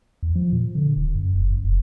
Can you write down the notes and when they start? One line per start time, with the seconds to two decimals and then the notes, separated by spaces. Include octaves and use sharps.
0.23 E2
0.35 F3
0.53 A#2
0.75 D3
0.96 D1
1.15 F#2
1.35 F#1
1.51 F#2
1.64 F1